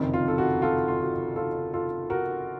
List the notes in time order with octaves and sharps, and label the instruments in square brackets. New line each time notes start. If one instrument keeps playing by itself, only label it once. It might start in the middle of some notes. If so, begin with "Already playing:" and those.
Already playing: [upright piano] F#1 F2 C3 D#3
F4
A4
F#4
F4 A4
F4
F#4
F4 A4
F4 A4
F#4 A#4